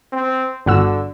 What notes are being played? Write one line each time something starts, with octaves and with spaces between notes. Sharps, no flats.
C4
G1 D3 F#4 E6